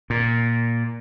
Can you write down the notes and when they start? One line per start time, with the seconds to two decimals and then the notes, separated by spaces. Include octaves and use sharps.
0.10 A#2